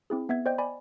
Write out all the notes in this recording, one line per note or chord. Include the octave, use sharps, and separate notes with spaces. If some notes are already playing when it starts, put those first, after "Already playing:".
C4 E4 G#4
B3 E5 G#6
C5 D5 D#5 G5 G6
D5 G#5 B5